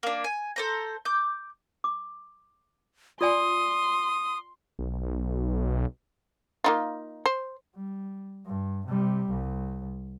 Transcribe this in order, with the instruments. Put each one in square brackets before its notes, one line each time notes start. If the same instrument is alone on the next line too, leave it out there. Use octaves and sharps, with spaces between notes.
[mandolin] A#3 D4
G#5
A4 C5 A#5
D6 G6
[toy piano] D6
[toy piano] F4 D5 G#5 [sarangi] C6 [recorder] D#6
[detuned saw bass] B1
[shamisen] A#3 D#4 F4
C5
[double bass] G3
G2
C3 G3
C2